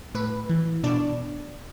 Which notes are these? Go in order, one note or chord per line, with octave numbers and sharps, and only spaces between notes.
A2 B4
E3
B2 D4 D5